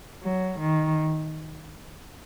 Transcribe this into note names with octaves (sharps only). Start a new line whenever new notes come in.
F#3
D#3